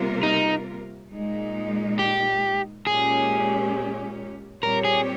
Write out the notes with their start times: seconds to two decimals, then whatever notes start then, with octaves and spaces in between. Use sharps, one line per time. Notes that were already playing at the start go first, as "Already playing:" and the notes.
Already playing: C3 G3 A#3 F4 A#4
0.23 D#4
1.11 A#2 G#3 D#4
1.99 G4
2.87 A#2 G#3 C#4 G4 G#4
4.62 A#2 G3 C4 G4 A#4 C#5
4.85 G#4